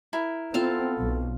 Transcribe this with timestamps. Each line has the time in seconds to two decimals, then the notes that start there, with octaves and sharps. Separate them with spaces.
0.13 E4 A#4
0.54 B3 C4 F4 A4 F5 A5
0.97 B1